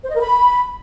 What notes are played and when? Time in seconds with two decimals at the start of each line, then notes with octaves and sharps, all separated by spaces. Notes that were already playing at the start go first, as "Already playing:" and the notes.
0.04 C5
0.09 D#5
0.15 A#4
0.20 B5